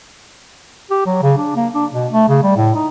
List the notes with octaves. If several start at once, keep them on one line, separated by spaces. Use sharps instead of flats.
G4
F#3
C#3
D4
A#3
D4
B2
A3
C#3
G3
A2
D#4